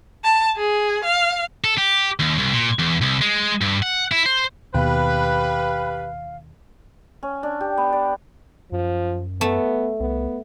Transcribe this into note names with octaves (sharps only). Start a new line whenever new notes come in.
A5
G#4
F5
A4
G4
D#2
C2
A#2
E2
C2
G#3
G2
F#5
E4
C5
D#2 B2 G4 B4 F5
C#4
D4
G4
B3
D5
F#2 F3
A3 B3
C2 B3